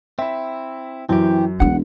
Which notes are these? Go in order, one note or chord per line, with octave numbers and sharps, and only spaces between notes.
C4 E4 E5
F#2 E3 C4 G4
E1 E3 D4 F#5